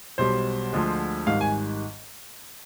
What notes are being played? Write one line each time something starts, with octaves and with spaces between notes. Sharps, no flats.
B1 B2 G3 C5
D2 D3 F3 G#3
G#1 G#2 D#3 G3 F5
G#5